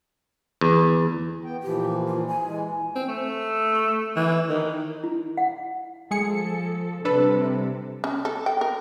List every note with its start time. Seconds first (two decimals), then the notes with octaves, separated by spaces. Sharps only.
0.61 E2
1.45 B3 G5
1.63 A#2 E3 F3 G4
2.06 F4
2.27 G#5
2.45 E3 G#3
2.96 C4
3.08 A3
4.16 E3
4.49 D#3
5.04 E4
5.37 F#5
6.11 F3 G#3 G#4 A4 C#7
7.05 C3 G3 D4 A4 B4
8.04 C#4
8.25 A4
8.46 G5
8.61 A#4